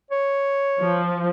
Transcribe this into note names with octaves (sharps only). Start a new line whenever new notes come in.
C#5
F3